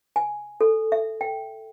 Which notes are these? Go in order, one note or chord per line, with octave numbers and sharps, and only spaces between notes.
G#5
A4
E5
G5